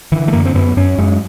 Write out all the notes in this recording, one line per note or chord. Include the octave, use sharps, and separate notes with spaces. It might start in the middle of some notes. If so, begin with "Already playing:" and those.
D3 E3
A3
F#2 A#3
C4
F#2 B3
F#2 C#4
F#2 G#3